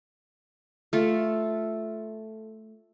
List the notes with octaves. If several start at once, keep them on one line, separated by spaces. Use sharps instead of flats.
A3 F4 A4